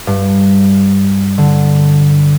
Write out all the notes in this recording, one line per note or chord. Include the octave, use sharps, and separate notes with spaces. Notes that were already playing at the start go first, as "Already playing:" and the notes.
G2
D3